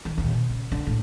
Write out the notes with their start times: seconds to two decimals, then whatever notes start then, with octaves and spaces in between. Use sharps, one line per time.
0.05 D#3
0.18 D#2 A#2
0.30 B2
0.50 C#3
0.72 D3
0.87 A2